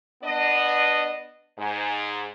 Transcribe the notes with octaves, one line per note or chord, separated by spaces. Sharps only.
B3 D4 D#5
G#2